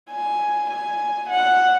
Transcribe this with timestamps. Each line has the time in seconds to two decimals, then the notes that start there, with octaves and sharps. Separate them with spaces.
0.10 G#5
0.70 G#5
1.30 F#5